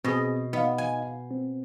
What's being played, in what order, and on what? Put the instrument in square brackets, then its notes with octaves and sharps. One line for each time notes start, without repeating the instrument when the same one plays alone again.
[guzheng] B2 D#5 [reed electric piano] C4 G#4
[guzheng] B3 [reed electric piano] D#4 D#5 F5
[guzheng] G#5
[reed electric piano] C4